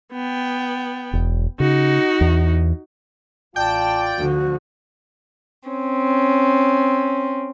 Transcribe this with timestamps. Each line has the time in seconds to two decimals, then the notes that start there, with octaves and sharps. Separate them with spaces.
0.13 B3 G5
1.13 E1
1.60 C#3 D#4 F#4
2.21 E2
3.56 A1 F4 D5 G5 A5
4.17 D2 D3 F3 F#4
5.67 C4 C#4